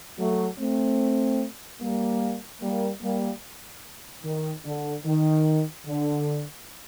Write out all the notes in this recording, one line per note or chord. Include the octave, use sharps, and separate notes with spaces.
F#3 A3
A3 C4
G3 A#3
G3 A#3
G3 A#3
D#3
D3
D#3
D3